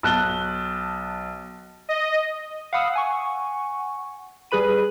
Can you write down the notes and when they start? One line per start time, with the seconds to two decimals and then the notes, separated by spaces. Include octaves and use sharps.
0.03 B1 A5 F#6 G7
1.89 D#5
2.73 F5 F#5 B5 D#6 E6
2.93 F#5 G#5 C#6
4.51 G3 G#4 B4 B5 D#7